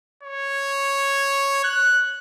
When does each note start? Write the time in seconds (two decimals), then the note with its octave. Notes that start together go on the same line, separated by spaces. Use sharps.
0.23 C#5
1.64 F#6